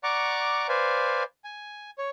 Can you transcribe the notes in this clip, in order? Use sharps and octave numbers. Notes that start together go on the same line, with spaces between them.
D5 F#5 A#5 C#6 D6
B4 C5 D5 F5 G#5
G#5
C#5